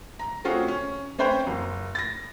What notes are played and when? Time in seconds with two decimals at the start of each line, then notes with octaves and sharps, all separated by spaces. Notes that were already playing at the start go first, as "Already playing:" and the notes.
0.19 A#5
0.44 A3 C4 C#4 F4 F#4 G#4
0.68 C#4
1.19 C4 C#4 B4 C5 G5
1.47 F#1
1.95 A6 A#6